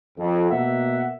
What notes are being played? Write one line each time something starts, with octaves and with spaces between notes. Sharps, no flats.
F2
B2 A#3 E5 F#5